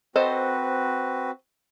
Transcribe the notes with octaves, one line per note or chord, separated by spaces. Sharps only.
C4 F#4 A4 B4 C5 D#5